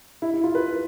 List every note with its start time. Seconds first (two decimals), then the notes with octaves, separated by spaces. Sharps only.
0.22 E4
0.34 E4
0.44 F4
0.55 B4